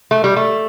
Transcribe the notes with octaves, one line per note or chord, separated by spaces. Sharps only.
A3
G3
A3